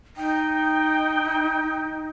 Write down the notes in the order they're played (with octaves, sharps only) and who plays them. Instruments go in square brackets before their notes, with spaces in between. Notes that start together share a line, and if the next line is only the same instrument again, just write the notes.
[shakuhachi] D#4 [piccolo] G5